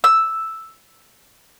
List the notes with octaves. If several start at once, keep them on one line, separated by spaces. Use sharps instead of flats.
E6